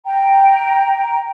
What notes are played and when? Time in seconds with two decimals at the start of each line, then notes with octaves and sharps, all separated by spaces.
0.06 G5 A#5